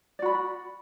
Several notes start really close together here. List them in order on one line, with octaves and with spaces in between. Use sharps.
D5 F#4 B5